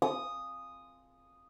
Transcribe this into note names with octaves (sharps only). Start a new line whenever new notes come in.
D#6